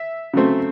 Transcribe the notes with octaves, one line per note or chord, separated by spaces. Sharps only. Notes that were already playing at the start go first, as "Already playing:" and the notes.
Already playing: E5
C#3 F#3 A3 C4